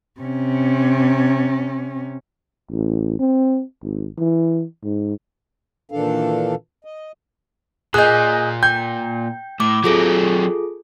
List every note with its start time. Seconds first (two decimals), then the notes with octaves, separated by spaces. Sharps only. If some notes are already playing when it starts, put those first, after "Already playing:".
0.21 C3 C#4
2.71 A1
3.19 C4
3.82 G#1
4.18 E3
4.83 G#2
5.92 A#2 D#3 E3 D4 A4 F5
6.85 D#5
7.94 A#2 G#4 D#5 F#6 G6
8.63 G5 G6
9.60 A2 D6
9.84 F#3 C4 F4 G#4 A4